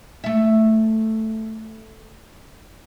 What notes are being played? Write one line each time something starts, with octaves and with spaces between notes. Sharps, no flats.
A3 E5